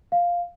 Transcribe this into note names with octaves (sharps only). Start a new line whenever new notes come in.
F5